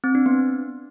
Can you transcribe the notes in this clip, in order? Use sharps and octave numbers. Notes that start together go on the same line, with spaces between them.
C4
D4
B3